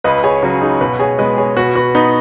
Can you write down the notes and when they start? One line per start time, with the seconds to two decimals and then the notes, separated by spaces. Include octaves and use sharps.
0.04 C#2 B4 D#5
0.24 G#4 C#5
0.43 C#3 F#3 C#4 F#4
0.62 D#4 G#4
0.80 B2 F#4 B4
0.99 G#4 C#5
1.18 G#3 B3 B4 D#5
1.37 G#4 C#5
1.57 B2 F#4 B4
1.75 F#4 B4
1.95 B3 D#4